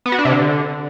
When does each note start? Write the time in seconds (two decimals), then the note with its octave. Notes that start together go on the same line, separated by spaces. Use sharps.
0.06 B3
0.12 F#4
0.19 D4
0.25 C3
0.32 D3